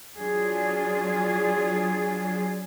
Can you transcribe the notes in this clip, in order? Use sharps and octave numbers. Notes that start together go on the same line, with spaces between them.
F#3 D4 F4 G#4